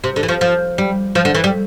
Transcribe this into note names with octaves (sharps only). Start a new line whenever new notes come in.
C3
D3
E3
F3
F3
G3
F3
D3
E3
G3